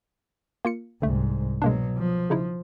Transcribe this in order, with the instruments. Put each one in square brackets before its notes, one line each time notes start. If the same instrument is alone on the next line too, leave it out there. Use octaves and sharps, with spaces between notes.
[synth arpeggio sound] A#3 F4 C#7
[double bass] C2 G#2 [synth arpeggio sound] D3 A3
[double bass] B2 F#3 [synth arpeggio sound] G#3 A#3 D4
[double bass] F3
[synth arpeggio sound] C#3 D#4 E4